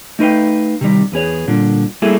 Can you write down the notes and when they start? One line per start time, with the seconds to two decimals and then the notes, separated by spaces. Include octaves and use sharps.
0.19 A3 D#4 B4 F5 G5
0.81 C3 D#3 G3
1.12 E2 B3 G#4 C#5
1.48 A#2 D3 G3
2.02 G3 A3 A#3 E4 G#4 A4